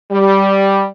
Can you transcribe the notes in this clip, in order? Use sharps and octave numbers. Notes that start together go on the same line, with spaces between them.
G3